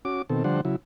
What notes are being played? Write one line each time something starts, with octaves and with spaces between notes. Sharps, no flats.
C#4 F#4 D6
B2 D#3 C4 A4
D3 F3 G3 D4 C5 F#5
C#3 F#3 E4